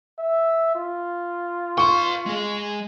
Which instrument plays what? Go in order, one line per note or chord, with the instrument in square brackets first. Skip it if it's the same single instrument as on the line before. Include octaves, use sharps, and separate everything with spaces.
[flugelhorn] E5
F4
[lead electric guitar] B4 C6 [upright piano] C#6
[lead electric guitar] G#3 G#4